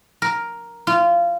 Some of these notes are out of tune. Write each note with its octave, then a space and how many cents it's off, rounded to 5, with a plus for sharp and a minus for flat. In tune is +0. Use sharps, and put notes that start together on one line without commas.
A#4 +5
F4 -20